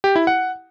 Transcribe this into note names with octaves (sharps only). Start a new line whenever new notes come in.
G4
E4
F#5